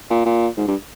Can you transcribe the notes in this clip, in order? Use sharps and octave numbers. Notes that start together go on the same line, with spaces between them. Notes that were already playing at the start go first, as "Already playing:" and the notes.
A#2
A#2
G#2
G2